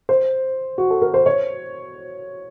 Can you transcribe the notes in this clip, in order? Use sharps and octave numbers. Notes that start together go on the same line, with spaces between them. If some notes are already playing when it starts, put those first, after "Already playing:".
C5
F#4
A4
A#4
C5
C#5